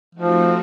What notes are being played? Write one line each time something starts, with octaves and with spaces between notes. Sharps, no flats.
F3 A3 C4 D#4 F#4